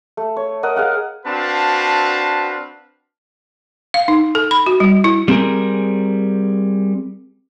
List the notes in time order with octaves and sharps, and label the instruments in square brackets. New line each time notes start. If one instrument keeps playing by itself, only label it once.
[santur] A3
C#5
A#4 D#5 F#5
G#4 F5 F#5
[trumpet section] C4 D4 F#4 B4 F5 A5
[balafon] F5
D#4
A4
B5
F#4
G3
E4
[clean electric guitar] G3 C4 G#4 A#4